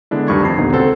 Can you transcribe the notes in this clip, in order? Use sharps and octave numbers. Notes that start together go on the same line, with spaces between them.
D3 G#3 B3 D4 E4
D2 G2 D#3 E5 C#6 G#6
F2 C7
A#1 D#2 D3 B3 D#4 A#5
C#2 C4 F#4 A4 C5 F#5